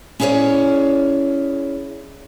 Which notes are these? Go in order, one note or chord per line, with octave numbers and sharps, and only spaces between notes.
C#4 E4 G#4 A4 C#5 D5